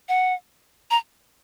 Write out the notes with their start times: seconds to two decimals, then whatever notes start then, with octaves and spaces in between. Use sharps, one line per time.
0.09 F#5
0.91 A#5